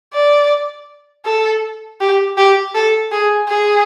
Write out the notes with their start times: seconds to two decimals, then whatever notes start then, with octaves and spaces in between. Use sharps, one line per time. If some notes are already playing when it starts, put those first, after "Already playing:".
0.14 D5
1.25 A4
2.00 G4
2.37 G4
2.75 A4
3.12 G#4
3.49 G#4